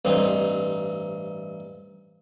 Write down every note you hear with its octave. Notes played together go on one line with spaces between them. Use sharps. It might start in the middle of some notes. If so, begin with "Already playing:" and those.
A1 G2 C4 D#4